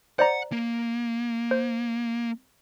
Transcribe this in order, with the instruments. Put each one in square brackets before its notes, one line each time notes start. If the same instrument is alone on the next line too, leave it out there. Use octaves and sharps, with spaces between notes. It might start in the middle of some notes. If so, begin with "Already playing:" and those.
[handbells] C5 D5 A#5 [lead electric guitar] F#5
[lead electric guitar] A#3
[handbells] C5